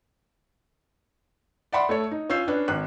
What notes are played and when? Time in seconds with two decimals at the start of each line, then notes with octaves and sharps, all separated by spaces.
1.73 D5 E5 F#5 B5 C6
1.89 A3 A4 C#5
2.11 D#4
2.30 C#4 F4 E6 G6 C7
2.48 C#4 D4 B4
2.68 G#1 F#6